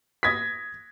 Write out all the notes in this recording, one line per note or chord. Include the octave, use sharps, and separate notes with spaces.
D#6 G#6 A#6 B6